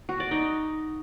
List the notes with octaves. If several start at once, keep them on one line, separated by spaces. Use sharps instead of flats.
F#4
D5
D#4